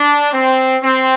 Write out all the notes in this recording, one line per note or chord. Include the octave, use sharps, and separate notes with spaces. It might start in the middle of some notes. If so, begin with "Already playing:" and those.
Already playing: D4
C4
C4